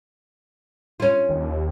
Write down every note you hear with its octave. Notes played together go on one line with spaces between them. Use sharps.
C#4 F4
D#2